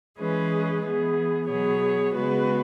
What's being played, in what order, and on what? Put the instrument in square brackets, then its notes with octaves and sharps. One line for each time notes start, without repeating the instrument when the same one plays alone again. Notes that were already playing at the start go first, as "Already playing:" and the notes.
[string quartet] E3 G#3 C#4 G#4 B4
E3 B3 G#4
B2 F#3 B3 G#4 C#5
C#3 G#3 B3 F#4 B4